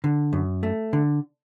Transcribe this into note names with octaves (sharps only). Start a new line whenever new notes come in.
D3
F#2
A3
D3